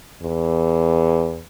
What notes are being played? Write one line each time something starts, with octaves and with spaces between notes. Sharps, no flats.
E2